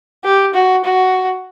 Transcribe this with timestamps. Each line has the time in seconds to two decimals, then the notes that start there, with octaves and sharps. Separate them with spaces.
0.24 G4
0.54 F#4
0.84 F#4